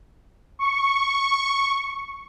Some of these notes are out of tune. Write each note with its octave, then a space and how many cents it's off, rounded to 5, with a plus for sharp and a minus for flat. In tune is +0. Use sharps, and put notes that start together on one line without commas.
C#6 -5